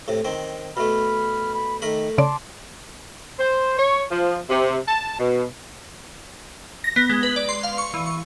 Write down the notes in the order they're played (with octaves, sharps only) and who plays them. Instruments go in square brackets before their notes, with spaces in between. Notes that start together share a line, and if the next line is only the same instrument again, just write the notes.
[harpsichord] A2 C3
D#3 C4
[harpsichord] B2 A3 [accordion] B5 F6
[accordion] B5
[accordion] D#3 [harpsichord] A3 A#4 B5
[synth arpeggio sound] C#3 D5 [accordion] A5 C6 D6
[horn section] C5
C#5
F3
C3
A5
B2
[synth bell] A#6
B3
G#3
B4
D5
C6
F5
C#6
E3
C#6